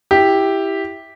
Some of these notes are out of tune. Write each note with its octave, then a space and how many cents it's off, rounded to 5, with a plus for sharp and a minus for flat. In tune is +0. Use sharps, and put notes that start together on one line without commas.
E4 +0 G4 +0